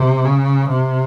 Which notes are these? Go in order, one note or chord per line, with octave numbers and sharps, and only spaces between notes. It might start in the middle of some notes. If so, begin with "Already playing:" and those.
Already playing: C3
C#3
C3